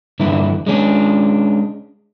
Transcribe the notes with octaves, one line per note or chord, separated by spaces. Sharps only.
G2 D3 E3 E4
G#3 C#4 D4